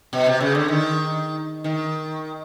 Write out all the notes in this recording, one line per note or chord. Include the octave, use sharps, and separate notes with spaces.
B2
C3
C#3
D3
D#3
D#3